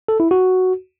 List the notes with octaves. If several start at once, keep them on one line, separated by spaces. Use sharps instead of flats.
A4
E4
F#4